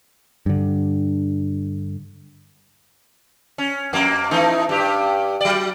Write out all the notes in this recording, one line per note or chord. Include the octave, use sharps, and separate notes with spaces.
G2 D3
C#4
F2 A#3
E3 A3 D#4
G2 G4
F#3 D5